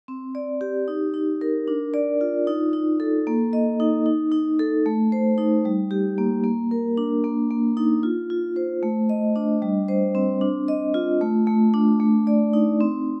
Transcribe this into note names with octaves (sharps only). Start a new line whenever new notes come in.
C4
D5
G4
D#4
D#4
A#4
D4
D5
F4
D#4
D#4
A4
A#3
D#5
D#4
D#4
D#4
A4
A3
C5
D#4
G3
G4
A#3
A#3
A#4
D4
A#3
A#3
D#4
F4
F4
C5
A3
D#5
D4
G3
C5
C4
D4
D#5
F4
A3
A3
D4
A3
D5
D#4
C4